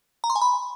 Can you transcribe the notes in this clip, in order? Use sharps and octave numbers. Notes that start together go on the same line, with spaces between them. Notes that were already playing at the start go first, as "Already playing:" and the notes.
A#5
C6
G#5
B5